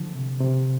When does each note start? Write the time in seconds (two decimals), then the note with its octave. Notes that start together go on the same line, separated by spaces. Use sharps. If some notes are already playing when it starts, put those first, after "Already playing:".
Already playing: D3 F3
0.15 C3
0.41 C3